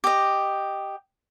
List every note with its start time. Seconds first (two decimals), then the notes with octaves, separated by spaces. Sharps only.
0.04 G4 D#5